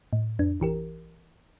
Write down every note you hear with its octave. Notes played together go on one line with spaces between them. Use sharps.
A2
F2 D4
A1 E3 G4 A#4